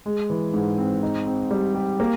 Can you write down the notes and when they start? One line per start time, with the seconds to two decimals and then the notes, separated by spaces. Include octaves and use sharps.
0.06 G#3
0.30 E3
0.54 G#2
0.78 C4
1.03 D#4
1.26 C4
1.51 G3
1.75 G4
2.00 A#3